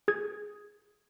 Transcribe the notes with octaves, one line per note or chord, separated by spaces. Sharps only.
G#4 G#6